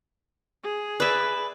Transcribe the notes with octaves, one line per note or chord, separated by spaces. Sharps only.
G#4
B4 D5 E5